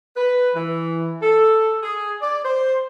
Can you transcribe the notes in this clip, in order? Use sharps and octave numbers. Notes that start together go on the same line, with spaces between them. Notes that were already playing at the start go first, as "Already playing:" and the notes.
B4
E3
A4
G#4
D5
C5